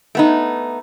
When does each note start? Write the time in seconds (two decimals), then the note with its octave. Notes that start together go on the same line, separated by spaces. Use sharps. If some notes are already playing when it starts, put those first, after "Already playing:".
0.15 A3 B3 D#4